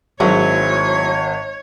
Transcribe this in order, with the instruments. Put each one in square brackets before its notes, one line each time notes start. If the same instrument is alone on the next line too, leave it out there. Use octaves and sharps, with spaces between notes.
[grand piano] G#1 [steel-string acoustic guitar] F#3 E4 G#4 [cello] C#5